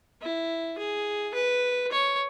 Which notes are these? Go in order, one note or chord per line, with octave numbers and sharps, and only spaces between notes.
E4
G#4
B4
C#5